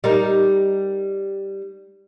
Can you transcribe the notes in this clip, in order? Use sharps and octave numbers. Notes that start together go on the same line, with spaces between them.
G3 D#4 A#4